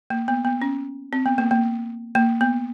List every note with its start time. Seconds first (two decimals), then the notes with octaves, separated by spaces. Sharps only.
0.10 A#3
0.28 B3
0.45 B3
0.62 C#4
1.13 C4
1.26 B3
1.38 A#3
1.51 A#3
2.15 A#3
2.41 B3